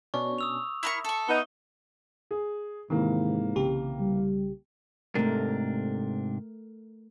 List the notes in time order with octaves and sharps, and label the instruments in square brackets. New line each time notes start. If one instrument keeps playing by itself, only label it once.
[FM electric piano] B2 C#4 D4 [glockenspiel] C#6
[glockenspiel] D#6 E6 F7
[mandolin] E4 A#4 C#6 [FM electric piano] E5
[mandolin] A4 C#6
[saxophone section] B3 D#4 [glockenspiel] G7
[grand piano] G#4
[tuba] G#2 [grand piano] C3 E3 A#3 [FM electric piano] D#3
[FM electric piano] B1 C#3 G4
[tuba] G3
[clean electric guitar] G#2 C3 D4 [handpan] A3 A#4